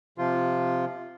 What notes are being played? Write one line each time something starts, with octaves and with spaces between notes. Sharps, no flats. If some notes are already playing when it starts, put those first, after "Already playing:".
C3 F3 F4